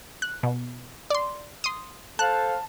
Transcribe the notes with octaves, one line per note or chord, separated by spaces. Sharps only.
F#6
B2
D5 C6
C6 D#6
A4 C5 F5 A5 F#6